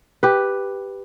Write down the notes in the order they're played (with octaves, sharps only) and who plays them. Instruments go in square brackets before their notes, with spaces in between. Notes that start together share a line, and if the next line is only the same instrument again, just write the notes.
[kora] G4 B4